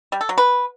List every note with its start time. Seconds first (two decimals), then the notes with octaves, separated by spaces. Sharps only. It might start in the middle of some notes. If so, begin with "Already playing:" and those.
0.12 G3
0.21 A4
0.29 F#3
0.38 B4